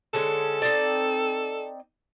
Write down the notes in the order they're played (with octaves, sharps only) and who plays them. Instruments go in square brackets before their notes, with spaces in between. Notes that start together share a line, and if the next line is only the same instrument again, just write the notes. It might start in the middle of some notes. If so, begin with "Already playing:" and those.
[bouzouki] D3 G#3 C#4 [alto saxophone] A4
[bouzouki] C4 D#4 D5